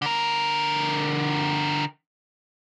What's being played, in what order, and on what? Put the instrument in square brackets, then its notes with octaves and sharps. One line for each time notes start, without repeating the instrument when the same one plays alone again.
[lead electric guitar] D3 A#4